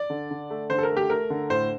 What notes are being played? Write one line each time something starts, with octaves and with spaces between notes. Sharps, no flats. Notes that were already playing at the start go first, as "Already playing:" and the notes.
Already playing: D5
D3
D3
A3
D3 C5
A4
A#4
A3
G4
A3 A#4
D3
A2 C5